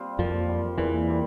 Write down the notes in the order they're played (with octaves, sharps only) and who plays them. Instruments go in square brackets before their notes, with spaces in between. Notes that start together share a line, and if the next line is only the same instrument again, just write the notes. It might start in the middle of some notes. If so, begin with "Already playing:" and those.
Already playing: [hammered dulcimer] G3 C4 F4
[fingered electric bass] F2 F3 [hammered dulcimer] A#2
[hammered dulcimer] G3 C4 F4
[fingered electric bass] E2 E3 [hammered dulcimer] A#2
[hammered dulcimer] G3 C4